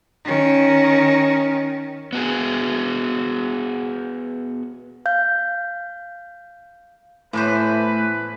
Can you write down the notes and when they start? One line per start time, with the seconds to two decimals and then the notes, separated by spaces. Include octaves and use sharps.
0.25 D#3 C#4
2.13 B3 F#4 G#4
5.06 F5 G6
7.33 A2 E3 A3 B3 B4 C5